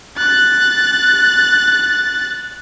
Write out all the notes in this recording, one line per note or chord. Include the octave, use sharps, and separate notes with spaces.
F#6 A6